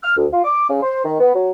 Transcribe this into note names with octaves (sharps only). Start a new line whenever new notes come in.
F6
D2
F4
D6
C#3
C5
D#3
B3
F#3